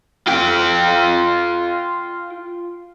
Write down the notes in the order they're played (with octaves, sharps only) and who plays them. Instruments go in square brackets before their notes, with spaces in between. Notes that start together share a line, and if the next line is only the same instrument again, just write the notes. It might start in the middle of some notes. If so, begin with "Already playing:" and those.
[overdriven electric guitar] F4 G5